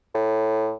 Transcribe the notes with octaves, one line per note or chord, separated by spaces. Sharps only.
A2